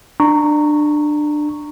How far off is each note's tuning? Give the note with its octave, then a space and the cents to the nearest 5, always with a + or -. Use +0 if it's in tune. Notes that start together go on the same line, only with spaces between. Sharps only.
D4 +20 A#5 -15 C#6 +0